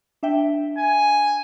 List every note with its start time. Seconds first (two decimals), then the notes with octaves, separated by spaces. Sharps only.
0.23 D4 E5 G5
0.78 G#5